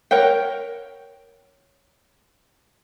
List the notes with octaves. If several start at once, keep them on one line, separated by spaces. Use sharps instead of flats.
A#4 C#5 F#5 G5